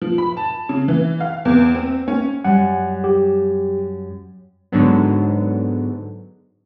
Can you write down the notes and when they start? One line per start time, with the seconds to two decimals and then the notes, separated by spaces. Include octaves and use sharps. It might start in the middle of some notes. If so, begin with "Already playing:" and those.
0.02 F3
0.18 B5
0.37 A5
0.69 C#3
0.88 E3
1.20 F5
1.45 E2
1.75 C4
2.08 C#4
2.44 F#2 G3 F#5 G#5
3.04 G4
4.72 G#2 D3 F#3 B3